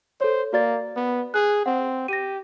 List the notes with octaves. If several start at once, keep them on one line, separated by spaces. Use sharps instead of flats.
A4 C5 C#5
A#3 F#4 D5 A6
B3
G#4 F#6
C4 F#5
G4 A#6 D#7